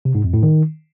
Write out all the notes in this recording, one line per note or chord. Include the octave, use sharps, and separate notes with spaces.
C3
G#2
F2
A2
D#3